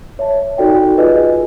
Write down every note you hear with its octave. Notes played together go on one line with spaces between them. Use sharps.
C#5 E5 A5
D#4 F#4 A4 D5 G5
F4 G#4 B4 D#5 G#5